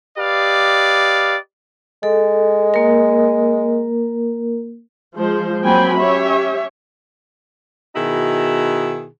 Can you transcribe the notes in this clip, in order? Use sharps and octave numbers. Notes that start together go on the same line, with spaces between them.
G4 B4 D5 D#5 F5
G#3 A4
A#3 A#4
F3 G#3 C5
F#3 A#3 C4 G5 G#5 B5
C#4 G4 C#5 E5
B2 D#3 D#4 E4 F#4 G#4